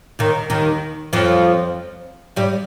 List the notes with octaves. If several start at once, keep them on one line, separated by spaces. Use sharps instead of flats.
D#2 D#3
D#2 D#3
F2 F3
G2 G3